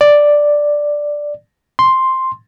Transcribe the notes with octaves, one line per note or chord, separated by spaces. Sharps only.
D5
C6